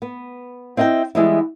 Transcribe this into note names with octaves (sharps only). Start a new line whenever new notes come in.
B3
C4 E4 D#5 E5 G5
E3 G3 G#3 B3 E4